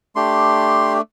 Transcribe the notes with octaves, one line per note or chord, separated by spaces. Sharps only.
A3 D4 G4 C6